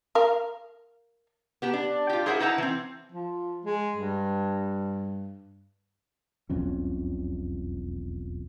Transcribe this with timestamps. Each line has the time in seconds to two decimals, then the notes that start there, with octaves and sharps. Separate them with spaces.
0.15 A#4 F5
1.62 B3 G4 A5
1.73 D4
2.09 F4 G4
2.26 E4 G#4 A#4 C5 E5 F#5
2.40 D#4 E4 B4 F#5 A5 A#5
2.58 E3 C4
3.12 F3
3.65 G#3
3.96 G2
6.50 E1 B1 F2 C#4